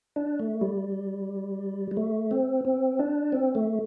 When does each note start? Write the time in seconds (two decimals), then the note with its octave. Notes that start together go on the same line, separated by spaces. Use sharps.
0.16 D4
0.40 A3
0.61 G3
1.91 G3
1.97 A3
2.31 C4
2.65 C4
2.99 D4
3.32 C4
3.55 A3